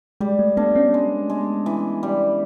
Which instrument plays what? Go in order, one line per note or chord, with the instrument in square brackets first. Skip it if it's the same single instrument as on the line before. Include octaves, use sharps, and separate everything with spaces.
[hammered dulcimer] G3 [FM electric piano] G#3
[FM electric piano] A3
[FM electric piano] A3 B3 [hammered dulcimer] D4
[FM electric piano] B3 C#4
[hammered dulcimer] G#3
G#3
E3
G3